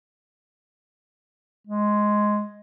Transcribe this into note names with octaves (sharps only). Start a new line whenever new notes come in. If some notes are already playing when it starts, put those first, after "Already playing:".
G#3